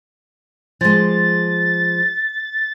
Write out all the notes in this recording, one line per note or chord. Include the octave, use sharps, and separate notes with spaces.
F3 G#3 A6